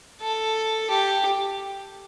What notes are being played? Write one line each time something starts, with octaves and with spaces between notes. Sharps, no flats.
A4
G4